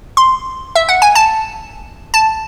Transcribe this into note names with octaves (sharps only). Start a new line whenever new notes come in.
C6
E5
F#5
G#5
A5
A5